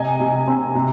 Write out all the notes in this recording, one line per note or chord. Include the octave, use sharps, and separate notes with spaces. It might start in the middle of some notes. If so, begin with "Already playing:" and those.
Already playing: C3 D#5 G#5
C3
C4
C3